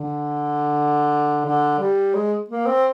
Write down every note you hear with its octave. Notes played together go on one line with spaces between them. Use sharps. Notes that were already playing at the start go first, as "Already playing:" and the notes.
Already playing: D3
D3
G3
G#3
A#3
C4